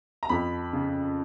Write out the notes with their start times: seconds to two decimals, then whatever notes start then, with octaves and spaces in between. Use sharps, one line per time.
0.23 A#5
0.29 F2 B5
0.73 C#3